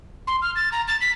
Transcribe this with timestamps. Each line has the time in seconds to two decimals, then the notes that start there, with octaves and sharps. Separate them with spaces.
0.27 C6
0.42 F6
0.56 A6
0.72 A#5
0.88 A6
1.01 B6